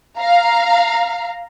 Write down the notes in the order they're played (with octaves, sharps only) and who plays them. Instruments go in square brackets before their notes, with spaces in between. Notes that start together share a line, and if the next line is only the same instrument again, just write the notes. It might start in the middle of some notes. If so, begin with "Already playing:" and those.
[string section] F5 A#5